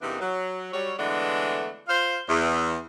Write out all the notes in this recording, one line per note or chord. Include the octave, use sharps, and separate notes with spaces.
E2 C3 E3 A#3 D4 D#4
F#3
F#3 G3 C#5
D3 E3 G#3 A3 B3 D4
F4 C5 F5
E2